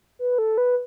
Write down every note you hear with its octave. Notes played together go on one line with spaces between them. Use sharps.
B4
A4
B4